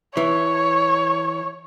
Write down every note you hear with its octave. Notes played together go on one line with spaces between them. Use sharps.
E3 C#5